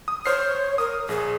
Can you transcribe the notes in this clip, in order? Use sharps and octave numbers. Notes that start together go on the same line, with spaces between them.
D#6
C5 C#5 F6 C7
A#4 D#6
A#1 G#4